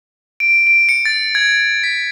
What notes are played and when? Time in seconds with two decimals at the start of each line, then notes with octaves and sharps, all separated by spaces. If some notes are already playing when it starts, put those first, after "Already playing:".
0.40 D7
0.67 D7
0.89 C#7
1.05 A6
1.35 G#6
1.84 B6